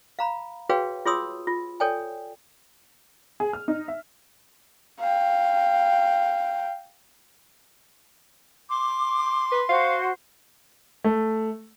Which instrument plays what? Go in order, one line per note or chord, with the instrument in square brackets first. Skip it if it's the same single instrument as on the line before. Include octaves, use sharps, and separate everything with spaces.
[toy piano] F5 A#5 B5
F#4 G#4 B4 C#5 F5 G5
F4 G#4 C#5 C6 D#6 E6
F4
A4 C#5 D5 G5 G#5
[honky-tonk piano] G#4
F6
D#4
E5
[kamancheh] F5 G5
[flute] C6 [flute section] D6
[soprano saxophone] B4
[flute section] F#4 C5 [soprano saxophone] F5
[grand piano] A3